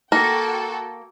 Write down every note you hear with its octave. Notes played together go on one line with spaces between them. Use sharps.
A#3 F#4 A4 G5